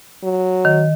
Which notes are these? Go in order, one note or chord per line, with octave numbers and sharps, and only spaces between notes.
F#3
D#3